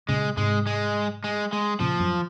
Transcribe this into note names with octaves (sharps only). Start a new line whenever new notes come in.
A#2 C#3 G#3
G#2 C3 G#3
G#3
G#3
G#3
A#2 C#3 F3
F#2 A#2